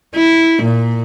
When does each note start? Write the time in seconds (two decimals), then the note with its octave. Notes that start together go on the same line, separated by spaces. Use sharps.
0.15 E4
0.63 A#2